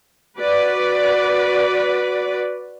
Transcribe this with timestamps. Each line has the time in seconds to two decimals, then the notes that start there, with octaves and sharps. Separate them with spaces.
0.38 F#4 B4 D5